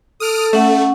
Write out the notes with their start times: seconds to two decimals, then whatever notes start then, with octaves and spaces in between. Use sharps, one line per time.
0.20 A4 D#6 F6 D7
0.53 A3 C#4 F#5